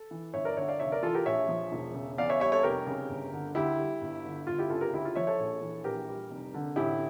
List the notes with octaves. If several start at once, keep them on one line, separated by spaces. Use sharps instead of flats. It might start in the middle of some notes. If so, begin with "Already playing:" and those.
Already playing: A4
E3
G1 C#5 E5
A#4 D5
D3 C#5 E5
D5 F5
F1 C#5 E5
A#4 D5
E3 F4 A4
G4 A#4
A#1 C#5 E5
F3
E1
C#3
E2 D5 F5
C#5 E5
G3 C#5 E5
A4 C#5
F1 G4 A#4
C#3
G1
D3
D2 E4 G4
G3
G1
D3
G1 F4
E4 G4
C#3 F4 A4
G4 A#4
D2 E4 G4
F4
F3 C#5 E5
A4 C#5
A#1
E3
A#1 G4 A#4
G3
F1
D3
A1 E4 G4